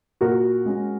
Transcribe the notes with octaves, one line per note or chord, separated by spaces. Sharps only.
A#2 F#4 A#4
G#3 C#4